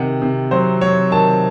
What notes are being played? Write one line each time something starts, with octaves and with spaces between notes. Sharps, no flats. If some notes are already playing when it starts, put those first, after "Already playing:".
Already playing: C3 D#3 F#5
C3
F#3 C5
F#3 C#5
D#3 A5